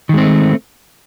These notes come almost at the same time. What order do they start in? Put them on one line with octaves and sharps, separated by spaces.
D#3 G#3 C4 A3